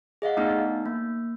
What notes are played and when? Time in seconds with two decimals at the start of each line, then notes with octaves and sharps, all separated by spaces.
0.22 G#4 D#5 F5 F#5
0.37 A3 B3 D4 D#4
0.86 A#3